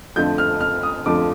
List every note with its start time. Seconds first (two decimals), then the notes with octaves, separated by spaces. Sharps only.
0.16 F2 D3 F3 A3 G6
0.38 F6
0.61 F6
0.83 D#6
1.06 F2 D3 F3 A3 D6